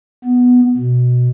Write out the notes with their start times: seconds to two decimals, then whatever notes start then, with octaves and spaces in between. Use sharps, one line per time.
0.25 B3
0.77 B2